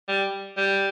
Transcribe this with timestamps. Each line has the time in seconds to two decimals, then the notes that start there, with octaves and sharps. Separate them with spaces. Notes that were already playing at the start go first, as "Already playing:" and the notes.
0.08 G3
0.57 G3